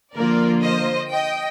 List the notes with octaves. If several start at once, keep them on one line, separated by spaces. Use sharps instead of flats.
D3 F3 A#3 F4 A#4 D5
C5 D#5
D#5 G5